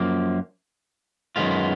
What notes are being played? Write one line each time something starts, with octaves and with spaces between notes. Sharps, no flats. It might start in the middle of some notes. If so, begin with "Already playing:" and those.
Already playing: F#2 F3 A#3
F#2 D#3 G#3 B3 F4